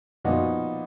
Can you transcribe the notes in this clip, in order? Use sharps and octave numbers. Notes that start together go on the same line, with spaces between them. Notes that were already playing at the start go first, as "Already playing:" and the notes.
A#2 F3 B3 D#4 F#4